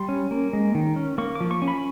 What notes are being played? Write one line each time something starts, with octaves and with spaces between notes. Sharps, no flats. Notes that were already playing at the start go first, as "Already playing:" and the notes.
Already playing: G3 C6
C#4
A#3
G#3
D#3
C#4
A#3 C#6
D6
F3
C#6
C#4
B5